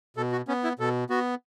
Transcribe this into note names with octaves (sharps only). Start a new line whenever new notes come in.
B2 A4
F#4
B3 C#4
E4
B2 A4
B3 F#4